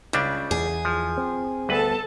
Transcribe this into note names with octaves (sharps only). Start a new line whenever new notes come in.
C#2 C#3 G3 D4
E2 G#4
F3
C4
D2 G3 B3 A4 B4 A5